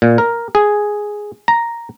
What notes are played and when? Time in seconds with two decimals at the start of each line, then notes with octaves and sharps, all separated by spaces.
0.02 A#2
0.18 A#4
0.55 G#4
1.48 A#5